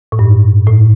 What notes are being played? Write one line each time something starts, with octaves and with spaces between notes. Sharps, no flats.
A2
G2
A2